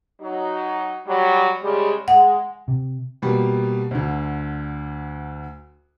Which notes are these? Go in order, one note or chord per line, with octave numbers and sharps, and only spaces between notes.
F#3 D#4
F#3 G3
C#3 G3 G#3
G#3 F#5
C3
B2 G3 A#3
D2 D3